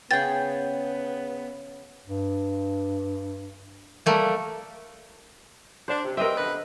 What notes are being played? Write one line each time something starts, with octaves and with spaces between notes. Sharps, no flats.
C#3 B3 G#4 F#5 G5 C#6 A6
G2
G3 A3 A#3
D4 C5
C3
G3 B3 C4 A#4 D#5 E5
D3 B3 B4